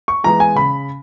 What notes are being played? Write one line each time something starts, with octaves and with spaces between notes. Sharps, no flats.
C#6
E3 G#3 B3 A#5
G#5
C#3 B5